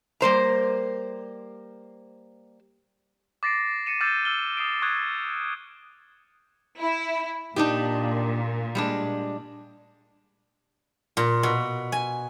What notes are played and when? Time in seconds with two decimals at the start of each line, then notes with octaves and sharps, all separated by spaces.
0.21 G3 A#3 C5 A#5
3.43 D6 A6 A#6 C7 D7
3.86 A6 A#6 C7 C#7 D#7 E7
4.01 D6 E6 F6 G6 A6
4.25 E6 F6 G7
4.57 D#6 C7 D7
4.82 C#6 D#6 F#6 G#6
6.81 E4
7.56 A#2 D4 D#4 G4
8.75 G3 G#3 D4
11.17 A#2
11.43 B2
11.92 G#5